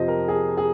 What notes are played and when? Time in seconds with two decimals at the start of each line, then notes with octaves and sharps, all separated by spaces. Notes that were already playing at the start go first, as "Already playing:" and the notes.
Already playing: F2 C3 F3 C5 D#5
0.08 A#4
0.28 G#4
0.57 G#4